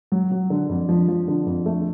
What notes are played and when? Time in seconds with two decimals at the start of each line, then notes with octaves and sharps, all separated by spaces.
0.12 F#3
0.32 F#3
0.50 D3
0.69 F2
0.89 F3
1.08 F3
1.28 D3
1.46 F2
1.66 A3